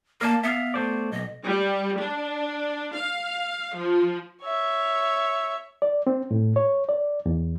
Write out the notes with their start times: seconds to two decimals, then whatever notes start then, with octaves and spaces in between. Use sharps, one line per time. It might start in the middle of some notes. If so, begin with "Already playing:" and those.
0.21 A#3 A#4 D5 A5
0.43 B3 E5 F5
0.74 A3 C5 D5
1.12 B1 D#5
1.44 G3
2.01 D4
2.94 F5
3.77 F3
4.43 C#5 E5
5.82 D5
6.07 C4
6.31 A2
6.56 C#5
6.89 D5
7.26 E2